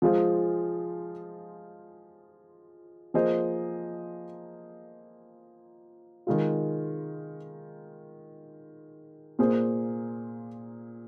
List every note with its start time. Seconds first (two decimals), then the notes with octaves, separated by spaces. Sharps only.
0.02 F3 G#3 F4 G#4 C5
3.14 F3 A#3 G#4 C5 D#5
6.27 D#3 G#3 F4
9.39 A#2 A#3 G#4 C5